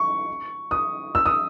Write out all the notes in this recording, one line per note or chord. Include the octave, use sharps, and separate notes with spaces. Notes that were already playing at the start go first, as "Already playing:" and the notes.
Already playing: C#6
D#6
E6
D#6